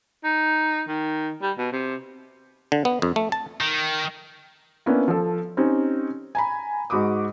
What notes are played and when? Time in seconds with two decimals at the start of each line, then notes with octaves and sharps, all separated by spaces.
0.24 D#4
0.88 D#3
1.42 G3
1.58 B2
1.72 C3
2.72 D3
2.85 B3
3.02 F2
3.16 A3
3.32 A5
3.61 D#3
4.86 A#3 B3 C#4 D4 E4
5.08 F3 A4
5.57 C4 C#4 D#4 G4
6.35 G#5 A#5 B5
6.90 G#2 F#4 B5 D6 D#6